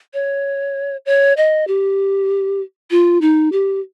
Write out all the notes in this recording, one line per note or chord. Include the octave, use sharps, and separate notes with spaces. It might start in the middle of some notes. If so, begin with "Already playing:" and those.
C#5
C#5
D#5
G4
F4
D#4
G4